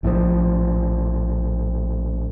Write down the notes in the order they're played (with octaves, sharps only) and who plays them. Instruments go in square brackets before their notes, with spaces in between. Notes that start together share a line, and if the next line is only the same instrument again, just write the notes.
[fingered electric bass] A#1 A2 C3 F3